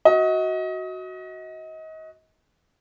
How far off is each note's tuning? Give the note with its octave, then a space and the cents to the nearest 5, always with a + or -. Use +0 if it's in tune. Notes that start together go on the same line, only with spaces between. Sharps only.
F#4 +0 D#5 +30